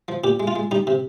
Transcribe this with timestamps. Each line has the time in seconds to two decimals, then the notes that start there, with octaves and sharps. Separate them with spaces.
0.08 F3
0.24 A#2 G4
0.40 G#3
0.47 F4
0.56 G#3
0.71 G3 D#4
0.87 C3